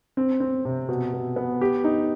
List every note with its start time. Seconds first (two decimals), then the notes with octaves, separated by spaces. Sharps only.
0.17 C4
0.40 C4
0.65 C3
0.89 B2
1.13 B2
1.36 B3
1.61 G4
1.84 D#4